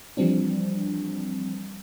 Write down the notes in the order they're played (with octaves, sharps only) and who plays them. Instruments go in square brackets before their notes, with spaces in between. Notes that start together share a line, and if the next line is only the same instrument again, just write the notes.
[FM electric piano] E3 F3 G3 C4 D4